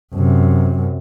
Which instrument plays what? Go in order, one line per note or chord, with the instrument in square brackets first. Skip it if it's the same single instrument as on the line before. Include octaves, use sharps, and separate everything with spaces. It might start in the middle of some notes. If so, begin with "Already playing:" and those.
[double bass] F#2 C3